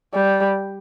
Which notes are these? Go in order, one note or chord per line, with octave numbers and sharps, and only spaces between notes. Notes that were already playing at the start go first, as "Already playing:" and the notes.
G3